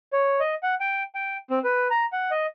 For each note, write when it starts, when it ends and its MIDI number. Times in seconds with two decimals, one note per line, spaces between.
0.13 0.40 73
0.40 0.54 75
0.63 0.75 78
0.80 1.03 79
1.15 1.37 79
1.50 1.59 60
1.64 1.88 71
1.90 2.05 82
2.12 2.30 78
2.31 2.46 75